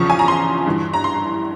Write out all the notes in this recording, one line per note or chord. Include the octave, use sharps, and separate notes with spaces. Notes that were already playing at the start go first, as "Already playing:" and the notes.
Already playing: E2 C#3 F3 C#6
G#5
A#5
C6
G2 E3
A#5
C6